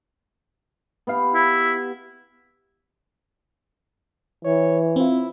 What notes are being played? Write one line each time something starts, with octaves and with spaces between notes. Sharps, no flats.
B3 G4 F5
E4
E3 C#5
C4 E4 F4